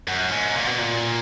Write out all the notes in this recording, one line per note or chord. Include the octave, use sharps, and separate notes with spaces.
F#2
G#2
A#2
B2
A#2